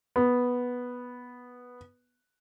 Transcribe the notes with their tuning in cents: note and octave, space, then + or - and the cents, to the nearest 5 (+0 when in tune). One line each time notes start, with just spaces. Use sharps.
B3 -5